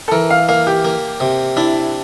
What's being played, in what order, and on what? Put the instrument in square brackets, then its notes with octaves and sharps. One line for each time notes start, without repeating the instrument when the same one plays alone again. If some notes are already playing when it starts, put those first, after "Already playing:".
[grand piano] A4
[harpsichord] E3 [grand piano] A#4
[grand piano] F5
[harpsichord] A#3 [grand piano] F5
[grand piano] G4
[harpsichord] A#3
C3
[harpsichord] D4 [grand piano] E4